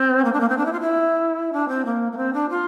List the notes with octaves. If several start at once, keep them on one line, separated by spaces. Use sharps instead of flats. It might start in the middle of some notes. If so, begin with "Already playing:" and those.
Already playing: C4
A#3
D4
A#3
C4
D4
E4
F4
E4
D4
C4
A#3
A#3
C4
D4
F4